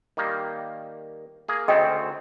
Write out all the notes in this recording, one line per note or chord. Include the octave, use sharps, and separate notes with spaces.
D#3 G3 A#3
A#3 G#4
D2 C#3 C4 D#5 G5